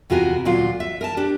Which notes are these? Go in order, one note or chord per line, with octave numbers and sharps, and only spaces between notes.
E2 C3 F4 F#4 A#4 G#5
D2 A#2 F#3 F4
E5
A#4 G#5 A5
D4 G4